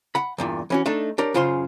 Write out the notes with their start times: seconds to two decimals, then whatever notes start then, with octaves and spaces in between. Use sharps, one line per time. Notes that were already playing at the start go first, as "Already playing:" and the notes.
0.15 F#5 B5
0.38 E2 G2 A#2
0.70 E3 C#4 F#4
0.86 A3 D4 D#4
1.18 D4 G4 A#4 C#5
1.34 F#2 C#3 F4 G#4 C5 C6